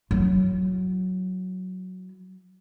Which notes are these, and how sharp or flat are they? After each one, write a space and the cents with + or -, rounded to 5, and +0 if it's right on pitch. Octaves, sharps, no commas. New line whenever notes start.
F#3 +0 E4 +0